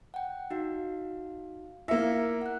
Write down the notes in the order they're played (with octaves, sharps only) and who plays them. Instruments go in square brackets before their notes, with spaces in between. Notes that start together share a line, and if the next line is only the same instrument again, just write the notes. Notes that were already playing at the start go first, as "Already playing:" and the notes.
[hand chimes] F#5 G5
D#4 F#4 F5
[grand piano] A#3 E5 [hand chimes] E4 A#6 C#7
[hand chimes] F#5 F#6